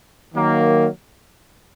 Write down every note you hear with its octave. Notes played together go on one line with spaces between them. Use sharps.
D#3 F#3 A#3